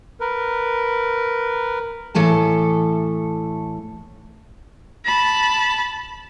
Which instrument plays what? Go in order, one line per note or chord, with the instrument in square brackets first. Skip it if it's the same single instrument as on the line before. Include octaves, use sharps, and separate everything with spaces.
[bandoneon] A#4 B4
[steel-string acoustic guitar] A2 E3 A3 A4 A5
[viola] A5 B5